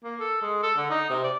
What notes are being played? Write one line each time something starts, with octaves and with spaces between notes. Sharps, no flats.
A#3
A4
G#3
A4
D3
D#4
C3
D5